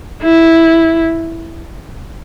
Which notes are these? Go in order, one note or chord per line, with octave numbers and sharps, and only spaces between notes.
E4